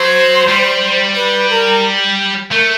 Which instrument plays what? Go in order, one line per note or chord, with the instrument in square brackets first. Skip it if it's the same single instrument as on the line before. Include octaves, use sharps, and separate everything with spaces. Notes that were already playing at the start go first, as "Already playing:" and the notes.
Already playing: [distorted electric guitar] F#3 [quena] C5
[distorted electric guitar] G3
[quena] B4
A#4
[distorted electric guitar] A3 [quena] A#4